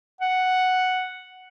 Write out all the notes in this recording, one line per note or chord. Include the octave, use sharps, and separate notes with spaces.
F#5